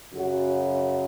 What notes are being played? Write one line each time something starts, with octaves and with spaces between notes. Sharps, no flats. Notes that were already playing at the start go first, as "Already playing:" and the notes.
F#2 C#3 F#3 F#4